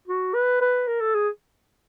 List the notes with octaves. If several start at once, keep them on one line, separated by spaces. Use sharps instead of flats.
F#4
B4
B4
A#4
A4
G#4